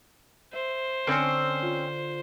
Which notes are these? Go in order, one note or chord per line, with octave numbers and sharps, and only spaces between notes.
C5 E5
D3 A#3 C4 C#4
F4